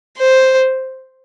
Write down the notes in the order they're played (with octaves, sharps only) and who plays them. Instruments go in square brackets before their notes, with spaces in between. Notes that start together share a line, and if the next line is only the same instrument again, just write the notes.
[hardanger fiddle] C5